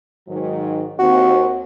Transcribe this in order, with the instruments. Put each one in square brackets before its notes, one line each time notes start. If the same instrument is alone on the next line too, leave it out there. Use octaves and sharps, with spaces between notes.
[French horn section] G#2 D#3 F#3
[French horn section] D#2 C4 [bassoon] F#4